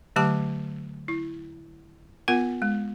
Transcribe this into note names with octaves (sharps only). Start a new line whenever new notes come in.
D3 F#3 A3 G4 A5 D6
E4
B3 F4 A#4 F#5
G#3